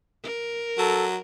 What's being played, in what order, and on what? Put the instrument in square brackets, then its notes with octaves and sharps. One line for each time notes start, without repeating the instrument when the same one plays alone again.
[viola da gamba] A#4
[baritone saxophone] F#3 [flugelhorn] A4